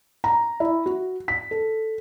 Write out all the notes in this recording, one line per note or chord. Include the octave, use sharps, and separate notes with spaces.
A#5
E4
F#4
B6
A4